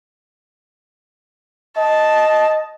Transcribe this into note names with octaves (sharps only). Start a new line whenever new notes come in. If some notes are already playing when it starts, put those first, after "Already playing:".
D#5 A5